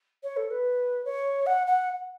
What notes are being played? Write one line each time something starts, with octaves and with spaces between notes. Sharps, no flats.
C#5
A4
B4
C#5
F#5
F#5